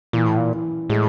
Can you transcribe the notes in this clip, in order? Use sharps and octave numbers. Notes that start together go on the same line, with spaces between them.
A#2 E3
A2
A#2
E3
A2 G#3